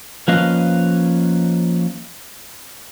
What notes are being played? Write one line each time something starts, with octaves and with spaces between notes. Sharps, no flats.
F3 A#3 C#4 B4 D#5 F5